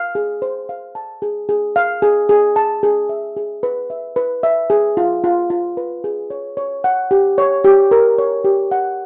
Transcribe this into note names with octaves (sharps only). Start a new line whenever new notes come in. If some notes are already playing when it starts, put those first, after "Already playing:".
Already playing: F5
G#4
C5
F5
A5
G#4
G#4
F5
G#4
G#4
A5
G#4
E5
G#4
B4
E5
B4
E5
G#4
F4
F4
F4
B4
G#4
C#5
C#5
F#5
G4
C#5
G4
A#4
C#5
G4
F#5